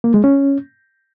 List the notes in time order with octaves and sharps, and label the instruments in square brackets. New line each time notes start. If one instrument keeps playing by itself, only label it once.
[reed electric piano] A#3
G#3
C#4